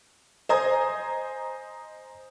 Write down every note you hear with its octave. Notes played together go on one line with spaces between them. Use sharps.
C5 D#5 G#5 A#5 D#6 G#6